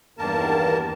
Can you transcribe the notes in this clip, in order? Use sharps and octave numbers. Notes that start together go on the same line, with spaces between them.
E2 G2 D#3 A#3 A#4 A5